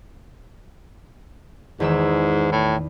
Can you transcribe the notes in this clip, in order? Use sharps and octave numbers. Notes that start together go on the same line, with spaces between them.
E2 G#2 D#3 E6
A2